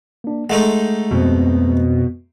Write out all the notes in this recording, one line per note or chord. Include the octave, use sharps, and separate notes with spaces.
A#3 D4
G#3 A3 D#4 F#5
F2 B2 C4